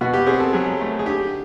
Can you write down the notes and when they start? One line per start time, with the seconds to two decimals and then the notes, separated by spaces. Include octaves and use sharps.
0.01 B2 F#4
0.13 G4
0.26 C4 G#4
0.40 A4
0.53 F#3 G#4
0.81 A3
0.99 G#4
1.06 D3 G4